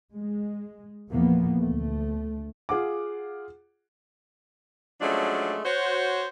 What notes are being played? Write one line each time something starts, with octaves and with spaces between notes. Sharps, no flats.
G#3
E2 A#2 E3 F3 A#3 B3
D2 A3
F4 G#4 F#5 D6
F3 F#3 G#3 A3 C#4 D4
F#4 C5 C#5